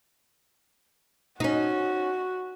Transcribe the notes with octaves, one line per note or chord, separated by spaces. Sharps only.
C#4 D#4 F#4